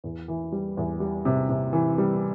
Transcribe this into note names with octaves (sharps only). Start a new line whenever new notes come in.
E2
E3
G3
E2
G3
C3
C3
E3
G3